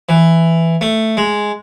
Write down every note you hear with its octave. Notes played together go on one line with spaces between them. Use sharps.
E3
A3
G#3